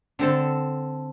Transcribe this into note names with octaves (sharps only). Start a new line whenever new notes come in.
D3 C4 A4